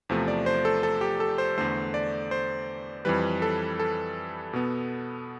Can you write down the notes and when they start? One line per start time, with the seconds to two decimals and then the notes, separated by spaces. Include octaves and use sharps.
0.09 E2 C3 F3 A3
0.28 D5
0.46 C5
0.65 A4
0.83 A4
1.01 G4
1.20 A4
1.38 C5
1.58 E2 D3 A3 C5
1.94 D5
2.31 C5
3.05 F2 E3 G3 B4
3.42 A4
3.80 A4
4.53 B2 B3